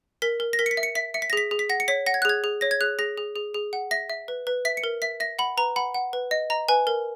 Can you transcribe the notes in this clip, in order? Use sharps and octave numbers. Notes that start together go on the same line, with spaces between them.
A#4 B6
A#4
A#6
A#4 B6
C#7
B6
E5
C#7
E5 B6
E5 C#7
B6
A#6
G#4 B6
G#4
B6
F#5 A#6
C#7
C#5 B6
F#5 A#6
G#6
F#6
G#4 G#6
G#4
C#5 A#6
G#6
G#4 F#6
G#4 A#6
G#4
G#4
G#4
F#5
E5 A#6
E5
B4
B4
E5 B6
C#7
A#4
E5 B6
E5 A#6
F#5 B5
B4 A#5
F#5 B5
F#5
B4
D#5
D#5 A#5
B4 G#5
A#4